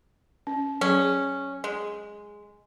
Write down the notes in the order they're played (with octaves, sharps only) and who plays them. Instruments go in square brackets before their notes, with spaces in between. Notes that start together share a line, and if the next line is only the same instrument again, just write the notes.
[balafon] C#4
[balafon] F#3 G#4 [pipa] C#4
[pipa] G#3